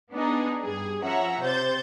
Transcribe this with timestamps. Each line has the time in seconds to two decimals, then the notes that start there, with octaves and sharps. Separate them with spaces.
0.11 B3 D4 D#4 G#4
0.63 G2 G#4
1.02 F3 C#4 E5 F#5 A#5
1.41 C3 C5 G6 A6